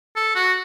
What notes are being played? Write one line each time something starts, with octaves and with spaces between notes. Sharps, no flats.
A4
F#4